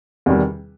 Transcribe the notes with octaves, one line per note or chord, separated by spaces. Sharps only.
E2 C3 D#3 G3